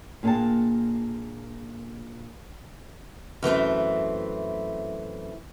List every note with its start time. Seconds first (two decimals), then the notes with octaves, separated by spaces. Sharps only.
0.23 A#2 A#3 D4 G#4 G5 A5
3.42 F#2 E3 A3 C4